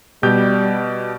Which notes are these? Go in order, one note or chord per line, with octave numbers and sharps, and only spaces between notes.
B2 G3 G4 G6